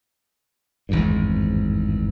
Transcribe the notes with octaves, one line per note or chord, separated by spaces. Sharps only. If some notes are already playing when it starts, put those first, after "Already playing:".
G#1 E2 G2